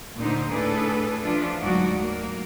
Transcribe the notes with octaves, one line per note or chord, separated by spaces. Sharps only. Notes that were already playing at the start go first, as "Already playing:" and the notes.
D2 A#2 D3 D#4 C5
A2 D4 G#4 A4 B4
E3 F3 D4 F4
D2 G#2 F#3 D#4 F#4 D5
A#3